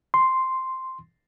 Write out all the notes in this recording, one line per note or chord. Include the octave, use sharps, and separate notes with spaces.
C6